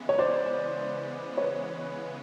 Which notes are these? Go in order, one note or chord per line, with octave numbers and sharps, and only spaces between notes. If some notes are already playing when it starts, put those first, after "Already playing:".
Already playing: C#3 E3 G#3 B3
C#5
C5 D5
B4 C#5